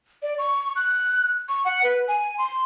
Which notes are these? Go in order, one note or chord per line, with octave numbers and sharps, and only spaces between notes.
D5
C#6
F#6
C#6
F#5
B4
G#5
C6